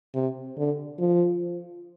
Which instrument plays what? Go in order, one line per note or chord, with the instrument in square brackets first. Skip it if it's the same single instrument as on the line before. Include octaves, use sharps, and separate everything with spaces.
[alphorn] C3
D3
F3